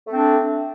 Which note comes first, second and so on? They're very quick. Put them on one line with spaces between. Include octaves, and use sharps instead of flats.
A3 C4 D4